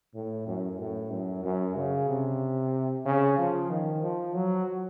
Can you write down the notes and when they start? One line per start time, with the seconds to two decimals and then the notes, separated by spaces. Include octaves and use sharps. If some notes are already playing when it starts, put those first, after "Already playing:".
0.14 A2
0.47 F#2
0.79 A2
1.11 F#2
1.43 F#2
1.76 C#3
2.09 C3
3.05 C#3
3.38 F3
3.70 D#3
4.02 F3
4.34 F#3